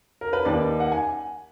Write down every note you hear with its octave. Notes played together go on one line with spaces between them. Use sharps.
A#4
B4
D#2 D5
F#5
G#5